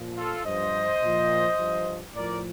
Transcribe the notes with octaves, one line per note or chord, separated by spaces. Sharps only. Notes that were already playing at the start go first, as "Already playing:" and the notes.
Already playing: A#2 F3
F4 A4
G2 F3 C5 D#5
A#2 F3
G2 F3
A2 F3 A#4 D5